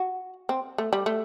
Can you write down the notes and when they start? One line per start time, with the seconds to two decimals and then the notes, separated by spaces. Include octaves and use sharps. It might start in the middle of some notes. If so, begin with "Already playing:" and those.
Already playing: F#4
0.49 C4
0.78 A3
0.93 G3
1.06 A3